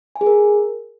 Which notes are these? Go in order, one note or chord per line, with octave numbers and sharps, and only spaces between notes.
G#5
G#4
A#4